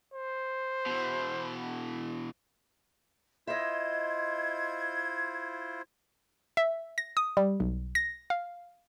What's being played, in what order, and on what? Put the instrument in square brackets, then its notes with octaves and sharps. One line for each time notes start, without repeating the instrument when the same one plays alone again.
[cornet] C5
[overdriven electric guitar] B2 E3
[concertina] E4 F4 C5 [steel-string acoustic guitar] D#5 E5 [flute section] G#6
[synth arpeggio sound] E5
A#6
D#6
G3
B1
A#6
F5